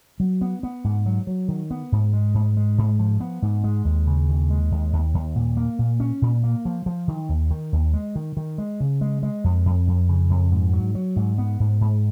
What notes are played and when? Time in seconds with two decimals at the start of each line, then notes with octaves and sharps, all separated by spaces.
0.20 F#3
0.41 B3
0.63 B3
0.84 G#2
1.06 F#3
1.27 F#3
1.48 D#3
1.71 B3
1.92 G#2
2.13 G#3
2.34 G#2
2.57 G#3
2.78 G#2
2.99 F3
3.20 B3
3.42 G#2
3.64 G#3
3.85 D#2
4.07 C#3
4.29 D#2
4.50 G#3
4.71 D#2
4.93 D#2
5.14 D#2
5.36 A#2
5.57 A#3
5.79 A#2
6.00 C#4
6.22 A#2
6.44 A#3
6.65 F3
6.86 F3
7.08 D#3
7.29 D#2
7.51 D#3
7.73 D#2
7.93 G#3
8.16 D#3
8.37 D#3
8.58 G#3
8.80 C#3
9.01 G#3
9.23 G#3
9.44 F2
9.66 F2
9.87 F2
10.09 C#3
10.30 F2
10.52 G#2
10.73 F#3
10.95 F#3
11.16 G#2
11.38 B3
11.60 G#2
11.81 G#2